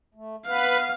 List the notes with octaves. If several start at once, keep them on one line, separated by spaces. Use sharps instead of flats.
A3
B3 B4 F5